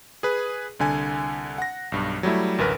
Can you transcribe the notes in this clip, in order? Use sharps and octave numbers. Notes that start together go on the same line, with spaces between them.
G#4 B4
C2 D3 G#5
F#5 A#6
B1 G2
F#3 G3 A3 E4
A1 D2 A#4 B4